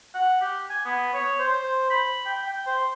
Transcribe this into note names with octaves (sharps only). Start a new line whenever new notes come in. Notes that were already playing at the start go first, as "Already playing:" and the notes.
F#5
G4
G#5
B3
C#5
C5
B5
G5
G5
C5